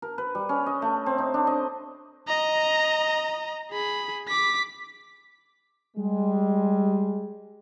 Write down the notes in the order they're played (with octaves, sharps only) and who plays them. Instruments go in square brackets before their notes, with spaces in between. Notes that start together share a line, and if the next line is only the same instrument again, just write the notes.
[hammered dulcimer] A#4
B4
G3
C#4
D#5
A3
C4
D#4
D4
D#5
[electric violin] D#5 A#5
G#4 B5
D6 B6
[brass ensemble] G3 G#3